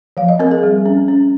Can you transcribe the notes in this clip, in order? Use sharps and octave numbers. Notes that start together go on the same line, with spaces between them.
F3 F5
D#5
C4 A#4
G#4
G3
C#4
C#4